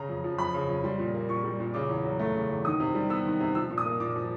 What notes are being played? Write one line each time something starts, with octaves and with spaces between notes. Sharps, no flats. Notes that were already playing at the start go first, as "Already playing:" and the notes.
Already playing: C#3 A#5
F2
F3
F2 B5
C#3
F2
G3 C6
A#2
A#3
A#2 C#6
G3
A#2
C#3 D6
E2
F#3
A3
C#3
E2
D#3 D#6
C3
G3
B3 E6
D#3
C3
F3 E6
A#2
D#6
A#3
A#2 D6
F3